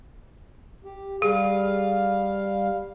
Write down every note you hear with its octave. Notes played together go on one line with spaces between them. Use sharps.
G4
G3 G#4 F5